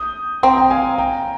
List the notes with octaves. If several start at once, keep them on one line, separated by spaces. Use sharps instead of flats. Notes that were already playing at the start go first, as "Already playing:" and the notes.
Already playing: D#6 G6
C4 G5 A#5
G5 A#5
F5 G#5
G5 A#5